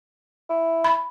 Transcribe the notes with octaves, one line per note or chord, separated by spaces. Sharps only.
E4
B5